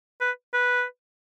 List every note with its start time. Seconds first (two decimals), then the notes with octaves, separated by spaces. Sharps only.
0.21 B4
0.54 B4